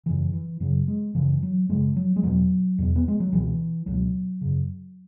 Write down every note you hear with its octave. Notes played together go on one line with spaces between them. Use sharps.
F#2 C#3 E3
E3
F#2 C#3 F#3
G#3
F#2 C#3 E3
F#3
F#2 C#3 G#3
F#3
G#3
E2 B2 F#3
E2 B2
B3
G#3
F#3
C#2 B2 E3
C#2 B2 F#3
F#2 C#3